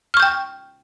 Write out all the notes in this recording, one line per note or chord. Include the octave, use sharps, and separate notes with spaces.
G5 C#6 F6 G6